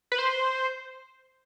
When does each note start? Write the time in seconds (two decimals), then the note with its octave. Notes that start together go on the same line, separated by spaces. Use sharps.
0.12 B4
0.18 C5